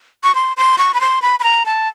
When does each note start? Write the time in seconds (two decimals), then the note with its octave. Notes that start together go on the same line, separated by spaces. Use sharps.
0.24 C#6
0.35 C6
0.57 C6
0.78 C#6
0.94 B5
1.01 C6
1.22 B5
1.40 B5
1.44 A#5
1.66 A5